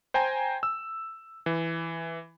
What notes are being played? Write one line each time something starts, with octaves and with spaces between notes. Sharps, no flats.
C5 G5 G#5 A#5
E6
E3